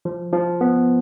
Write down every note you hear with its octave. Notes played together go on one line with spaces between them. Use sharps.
F3
F3
B3